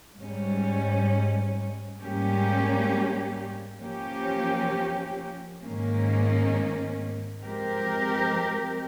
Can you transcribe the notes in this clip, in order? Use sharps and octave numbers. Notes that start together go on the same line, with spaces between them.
G#2 G3 C#4
G#2 G3 A#3 C#4 G4
F3 A#3 C#4 G4
G#2 D#3 A#3 C#4
F3 G#3 C4 G4 A#4